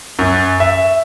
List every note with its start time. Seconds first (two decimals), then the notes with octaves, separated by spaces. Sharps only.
0.19 F#2
0.60 E5